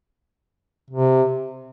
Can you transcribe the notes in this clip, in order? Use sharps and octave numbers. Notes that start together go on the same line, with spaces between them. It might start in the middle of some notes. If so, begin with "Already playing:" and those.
C3